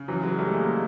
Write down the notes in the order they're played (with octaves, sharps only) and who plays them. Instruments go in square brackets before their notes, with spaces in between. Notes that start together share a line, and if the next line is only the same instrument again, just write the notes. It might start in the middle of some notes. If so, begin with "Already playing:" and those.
Already playing: [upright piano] C#3
[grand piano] E3 F#3
F#3 G#3
G3 A3
G#3 A#3